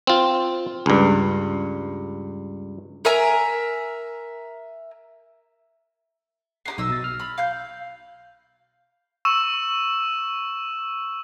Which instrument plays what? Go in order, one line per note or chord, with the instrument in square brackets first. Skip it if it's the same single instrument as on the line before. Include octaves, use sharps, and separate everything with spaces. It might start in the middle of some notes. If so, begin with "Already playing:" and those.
[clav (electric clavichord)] C4 F4
C#2 G2
[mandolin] A#4 E5 G#5 A#5
[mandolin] B3 D#4 G4 [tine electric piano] C7
[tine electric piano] B1 [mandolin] D#5 E5 E6
[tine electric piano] B2 A6
F6
[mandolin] B5
F5 G6
[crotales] C#6 E6 E7